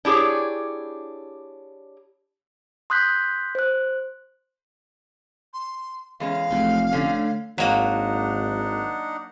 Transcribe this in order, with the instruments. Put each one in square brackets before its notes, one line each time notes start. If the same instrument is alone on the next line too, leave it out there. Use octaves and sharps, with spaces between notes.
[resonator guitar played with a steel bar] D4 E4 G4 G#4 C#5
[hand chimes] C6 D#6 F#6 G6 B6
C5 F#6
[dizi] C6
[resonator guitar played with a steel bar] E2 G#3 C#4 [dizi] F5
[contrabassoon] F1 [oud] F#3 A3
[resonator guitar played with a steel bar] D3 C#4 [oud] A3
[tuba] G#1 [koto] F#3 A#3 [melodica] D4 D#4 F#5